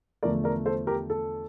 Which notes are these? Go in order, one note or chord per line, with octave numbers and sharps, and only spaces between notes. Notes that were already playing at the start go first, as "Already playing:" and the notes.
E2 D3 F3 A3 A#4 D5
A#4 D5
A4 C5
G4 A#4
A4